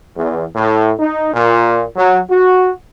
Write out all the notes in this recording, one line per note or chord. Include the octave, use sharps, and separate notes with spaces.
E2
A2
D#4
A#2
F#3
F#4